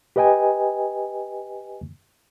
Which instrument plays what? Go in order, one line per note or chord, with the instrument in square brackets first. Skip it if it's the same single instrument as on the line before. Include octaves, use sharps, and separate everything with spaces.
[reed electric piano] G4 B4 D#5 G5 G#5